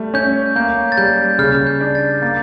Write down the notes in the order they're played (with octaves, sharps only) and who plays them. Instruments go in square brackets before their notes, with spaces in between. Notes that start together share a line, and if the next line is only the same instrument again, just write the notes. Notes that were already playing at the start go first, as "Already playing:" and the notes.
Already playing: [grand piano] G3 A3
[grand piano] C#4 [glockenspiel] G6
[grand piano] A#3 [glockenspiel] G6
[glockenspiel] A6
[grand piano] G3 [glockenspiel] G6
[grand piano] C#3 [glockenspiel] F6
[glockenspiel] G6
[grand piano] D4
[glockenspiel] A6
[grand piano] A#3 [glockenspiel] A6